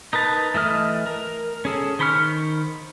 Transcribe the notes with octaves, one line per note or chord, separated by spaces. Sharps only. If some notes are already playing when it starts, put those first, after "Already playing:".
D#4 A#4 B4 A5
E3 A3 D#5 F6
A#4
C#4 G#4 A4
D#3 C5 B5 C#6 F6